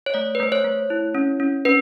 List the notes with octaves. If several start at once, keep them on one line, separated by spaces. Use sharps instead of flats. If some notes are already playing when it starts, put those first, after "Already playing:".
C#5
A3 D5
B4
A3 C5
C#5
A3
E4
C#4
C#4
C#4 B4